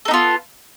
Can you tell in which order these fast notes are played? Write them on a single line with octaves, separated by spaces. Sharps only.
A4 D#4 B3 F4